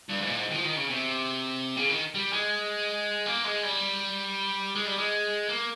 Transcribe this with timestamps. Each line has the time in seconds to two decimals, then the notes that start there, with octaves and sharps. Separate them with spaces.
0.09 G2
0.22 G#2
0.28 A#2
0.37 G#2
0.51 D#3
0.55 F3
0.65 D#3
0.77 C#3
0.90 C3
1.77 C#3
1.89 D#3
2.14 G3
2.33 G#3
3.26 A#3
3.44 G#3
3.63 G3
4.75 G#3
4.86 G3
4.98 G#3
5.49 A#3